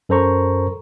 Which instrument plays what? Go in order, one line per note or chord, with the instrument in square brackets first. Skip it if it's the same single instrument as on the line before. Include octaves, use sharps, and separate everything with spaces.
[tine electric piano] F#2 A4 A#4 C5 A#5 C#6